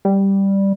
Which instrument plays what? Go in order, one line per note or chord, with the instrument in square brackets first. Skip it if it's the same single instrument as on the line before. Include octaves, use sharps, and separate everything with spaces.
[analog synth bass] G3